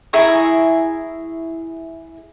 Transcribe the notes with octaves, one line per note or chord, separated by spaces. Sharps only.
E4 G#4 A#5 C#6